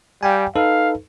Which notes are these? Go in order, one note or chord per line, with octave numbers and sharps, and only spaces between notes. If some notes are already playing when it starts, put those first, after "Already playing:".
G3 F5 G5 G#5
D#4 A4 B4 F5